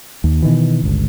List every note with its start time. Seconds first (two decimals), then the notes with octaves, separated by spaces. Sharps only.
0.24 D#2
0.43 B2 D#3 E3
0.84 G1 C#2